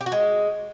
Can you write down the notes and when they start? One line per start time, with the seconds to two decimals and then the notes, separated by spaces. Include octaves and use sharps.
0.01 G4
0.06 F#4
0.12 G#3